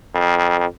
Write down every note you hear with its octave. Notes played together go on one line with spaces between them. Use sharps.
F2